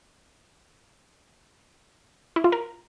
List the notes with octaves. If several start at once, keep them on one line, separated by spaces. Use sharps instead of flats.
E4
F4
A#4